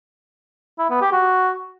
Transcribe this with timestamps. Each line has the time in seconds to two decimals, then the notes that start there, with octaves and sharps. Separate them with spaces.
0.79 E4
0.90 B3
1.01 G4
1.12 F#4